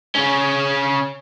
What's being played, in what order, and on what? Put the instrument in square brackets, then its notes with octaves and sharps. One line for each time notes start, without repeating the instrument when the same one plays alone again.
[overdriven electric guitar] C#3 C#4